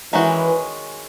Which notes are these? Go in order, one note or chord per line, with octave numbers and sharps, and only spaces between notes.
D#3 E3 G#3 C#4 F#4